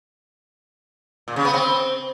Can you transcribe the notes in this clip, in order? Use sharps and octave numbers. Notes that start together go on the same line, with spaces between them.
A#2
C#3
B3
C4